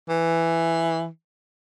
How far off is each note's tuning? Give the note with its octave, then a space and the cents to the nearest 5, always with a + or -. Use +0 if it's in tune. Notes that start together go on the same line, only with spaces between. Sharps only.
E3 +5